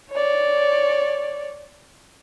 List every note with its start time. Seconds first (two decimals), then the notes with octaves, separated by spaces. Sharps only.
0.11 C#5 D5